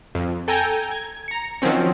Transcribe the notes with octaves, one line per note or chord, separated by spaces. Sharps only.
F2
A4 G5 G#5 A#5 G6
G#6
A#5 C#7
D#3 F3 F#3 C4 C#4